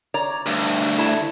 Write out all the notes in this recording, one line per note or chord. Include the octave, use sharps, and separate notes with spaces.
C#5 D5 A#5
D2 G2
A3 E4 A5